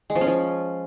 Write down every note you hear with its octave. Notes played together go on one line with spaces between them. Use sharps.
G#3
F3
C#4
F3